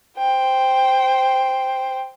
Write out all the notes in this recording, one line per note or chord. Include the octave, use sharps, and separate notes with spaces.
C5 G5